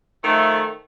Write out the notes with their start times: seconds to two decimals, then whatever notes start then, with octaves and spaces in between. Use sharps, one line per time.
0.24 D#3 F3 A3